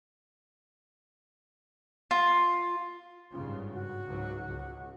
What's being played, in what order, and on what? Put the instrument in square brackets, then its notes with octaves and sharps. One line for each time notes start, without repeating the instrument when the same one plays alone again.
[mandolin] F4
[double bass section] G#1 G2 C#3 [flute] F4
[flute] F#4
[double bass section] C#2 G#2 F#3
C#2